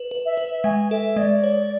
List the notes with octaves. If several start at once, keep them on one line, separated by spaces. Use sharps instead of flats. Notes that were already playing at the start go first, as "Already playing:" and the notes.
Already playing: B4
B4
E5
B4
G#3 G#5
A4 E5
G#3 D5
C#5